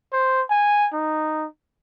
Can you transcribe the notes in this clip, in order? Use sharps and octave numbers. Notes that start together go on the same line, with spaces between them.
C5
G#5
D#4